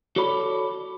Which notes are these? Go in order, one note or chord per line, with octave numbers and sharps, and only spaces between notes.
F#4 A4 C#5 D5 B5